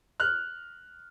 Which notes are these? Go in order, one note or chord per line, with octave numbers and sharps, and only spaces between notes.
F6 F#6